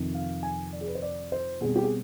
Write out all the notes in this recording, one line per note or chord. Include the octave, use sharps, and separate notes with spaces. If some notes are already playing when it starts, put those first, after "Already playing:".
Already playing: F2 C3 D#3
F5
G#5
D5
G#4
B4
C5
D5
C5
B2 G3 C4 G#4
G4
G#4